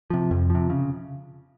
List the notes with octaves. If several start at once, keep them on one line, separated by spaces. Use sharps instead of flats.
C3 F3
F2
F3
C3
C#3